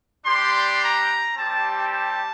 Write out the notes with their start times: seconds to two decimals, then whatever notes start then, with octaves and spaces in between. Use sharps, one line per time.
0.25 G3 D4 G4 C6
0.81 A#5
1.36 G3 C4 G4 A5
1.92 A5